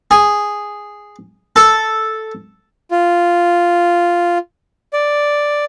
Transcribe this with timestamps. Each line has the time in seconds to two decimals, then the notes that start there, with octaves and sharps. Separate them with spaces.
0.11 G#4
1.56 A4
2.91 F4
4.93 D5